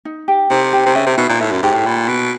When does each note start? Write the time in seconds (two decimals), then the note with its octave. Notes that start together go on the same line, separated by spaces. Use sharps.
0.05 D#4
0.28 G4
0.50 C3 D#4
0.73 G4
0.86 C3
0.95 C#3 E5
1.06 C3
1.17 B2 D#4
1.29 A#2
1.40 A2 E5
1.52 F#2
1.63 G#2 G4
1.74 A2
1.85 A#2 B5
2.08 B2 B5